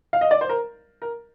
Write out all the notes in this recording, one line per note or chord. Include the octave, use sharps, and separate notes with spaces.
F5
D#5
D5
C5
A#4
A#4